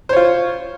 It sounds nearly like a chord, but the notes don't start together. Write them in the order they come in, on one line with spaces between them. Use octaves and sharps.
C5 C#5 F4